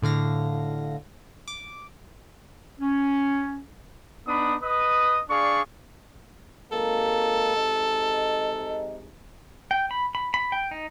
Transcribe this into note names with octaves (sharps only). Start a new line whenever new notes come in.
A2 D3 F5 A#6
D6
C#4
B3 D4 D#4 B5 D#6
B4 D#5 D#6
D4 G#4 D5 F5 C#6
G#1 G#3 A#3 A4
C3 G#3 D#4
G5
B5
B5
B5
G5
D#4